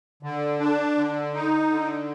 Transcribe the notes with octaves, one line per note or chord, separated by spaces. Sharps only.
D3
D4
D3
D#4
D3